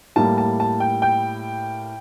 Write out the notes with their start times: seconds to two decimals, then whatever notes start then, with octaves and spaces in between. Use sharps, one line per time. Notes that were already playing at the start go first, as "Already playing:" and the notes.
0.16 A2 G3 A#3 A5
0.38 A5
0.60 A5
0.80 G5
1.02 G5